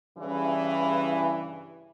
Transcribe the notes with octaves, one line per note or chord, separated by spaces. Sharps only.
G2 C#3 E3